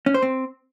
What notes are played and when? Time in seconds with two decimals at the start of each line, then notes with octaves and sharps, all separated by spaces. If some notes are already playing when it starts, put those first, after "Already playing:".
0.06 C#4
0.14 C5
0.23 C4